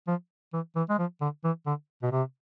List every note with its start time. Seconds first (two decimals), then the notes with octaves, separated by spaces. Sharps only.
0.07 F3
0.53 E3
0.75 E3
0.89 G#3
0.98 F3
1.21 D3
1.44 E3
1.66 D3
2.03 B2
2.12 C3